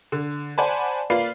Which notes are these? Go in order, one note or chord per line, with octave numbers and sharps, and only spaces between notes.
D3
C5 D5 F#5 G#5 A5 B5
A#3 F4 B4 D5 F5 C7